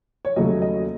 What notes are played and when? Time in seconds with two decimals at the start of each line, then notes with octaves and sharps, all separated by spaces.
0.25 C#5
0.36 D#2 C#3 F#3 A3 D#5
0.62 D#5